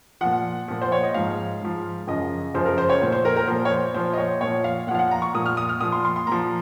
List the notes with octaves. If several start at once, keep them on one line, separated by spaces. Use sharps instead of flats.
A#2 F3 F#5
A#2 F3
C5
C#5
D#5
G#2 F3 F5
G#2 F3
F#2 C#3 F3 D#5
F#2 C#3 F3 C5
A#4
C5
C#5
A#2 F3 C5
C5
A#4
A#4
A#2 F3 C5
C#5
C5
A#2 F3 C5
D#5
C#5
A#2 F3 C#5
F5
A#2 F3 F5 F#5
F#5
A#5
C#6
A#2 F3 D#6
F6
D#6
F6
A#2 F3 D#6
C6
C6
C6
A#2 F3 A#5